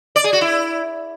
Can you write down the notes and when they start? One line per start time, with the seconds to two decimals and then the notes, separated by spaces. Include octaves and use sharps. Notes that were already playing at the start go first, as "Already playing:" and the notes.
0.16 D5
0.24 G#4
0.33 F#4
0.41 E4